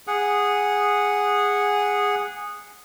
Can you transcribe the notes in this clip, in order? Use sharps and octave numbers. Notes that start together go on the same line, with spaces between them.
G#4 F#5